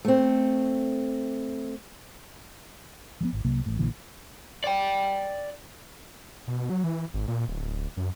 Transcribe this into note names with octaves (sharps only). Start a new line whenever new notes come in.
A3 C4
F3 F#3 B3
G#1
C2 C3 F#3 A#3
A1 A2
A#1 A#2 D3 E3
D5 G5
B2
F#3
E3
G#1
A#2
D1
F#2